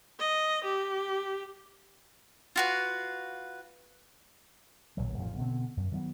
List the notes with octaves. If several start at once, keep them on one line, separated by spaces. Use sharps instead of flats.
D#5
G4
F4 F#4 B4
D1 A#1 E3 F#3
A1 F2 G#2 F3
B2 D3 B3 C4
F#2
D#3 F#3 G3 B3